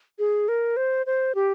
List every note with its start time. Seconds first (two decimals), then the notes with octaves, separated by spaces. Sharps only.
0.19 G#4
0.48 A#4
0.77 C5
1.06 C5
1.35 G4